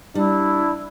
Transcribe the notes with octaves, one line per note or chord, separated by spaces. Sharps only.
G3 D4 E4